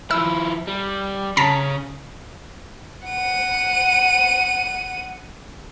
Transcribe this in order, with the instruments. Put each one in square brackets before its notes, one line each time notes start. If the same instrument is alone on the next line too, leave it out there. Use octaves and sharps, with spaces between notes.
[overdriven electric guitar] F3 E4 [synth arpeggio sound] E6
[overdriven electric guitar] G3
[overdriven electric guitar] C#3 C#4 [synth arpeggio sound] A5 A#5 B6
[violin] F#5 D#7